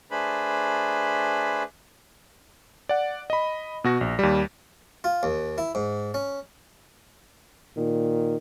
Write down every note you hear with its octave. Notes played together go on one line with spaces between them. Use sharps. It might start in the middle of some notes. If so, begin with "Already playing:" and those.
A3 D4 G#4 B4 C5 B5
D5 F#5
D#5 B5
B2 F#4 A#6
A#1
D#2 G3
F4
D#2
E4
G#2
C#4
A#2 D#3